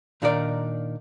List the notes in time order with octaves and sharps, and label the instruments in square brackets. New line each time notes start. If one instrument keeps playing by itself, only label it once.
[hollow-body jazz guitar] A#2 D#3 D4 D#4 A#4 D5